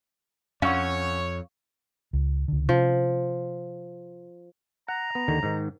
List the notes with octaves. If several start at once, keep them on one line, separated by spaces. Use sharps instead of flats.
F2 C#4 C#5 F5 F#5 C#6
C#2
C#2 D3
C3 F3 C#4
F#5 A#5
B3
D#2 D3 D#3
G#2 D#3